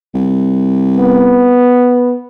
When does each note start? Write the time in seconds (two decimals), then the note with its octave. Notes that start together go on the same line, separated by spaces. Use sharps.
0.14 C2
0.97 B3